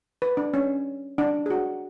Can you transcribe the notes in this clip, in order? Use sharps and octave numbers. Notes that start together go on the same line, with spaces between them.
B4
D4
C#4
D4
G#4
F#4